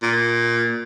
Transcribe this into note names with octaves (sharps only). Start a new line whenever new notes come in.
A#2